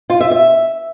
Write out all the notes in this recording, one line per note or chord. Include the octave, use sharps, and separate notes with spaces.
F4
E5
E5